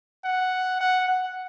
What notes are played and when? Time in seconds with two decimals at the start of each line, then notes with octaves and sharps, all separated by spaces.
0.25 F#5
0.81 F#5
1.08 F#5